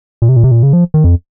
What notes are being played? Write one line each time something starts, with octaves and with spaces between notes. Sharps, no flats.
A#2
C3
A#2
C3
A#2
C#3
F3
D#3
F2